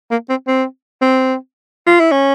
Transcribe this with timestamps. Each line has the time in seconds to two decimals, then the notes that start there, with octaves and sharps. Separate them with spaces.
0.11 A#3
0.29 C4
0.48 C4
1.02 C4
1.87 F4
2.00 E4
2.12 C#4